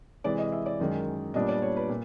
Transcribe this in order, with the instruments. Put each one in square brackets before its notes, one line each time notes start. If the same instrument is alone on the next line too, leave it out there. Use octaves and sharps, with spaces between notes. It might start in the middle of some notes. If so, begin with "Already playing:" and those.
[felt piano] C3 E3 G#3 D5
D#5
E5
D5
F#2 D#3 G#3
A#2 G3 B3 D4 D#5
D5
C#5
B4
A#2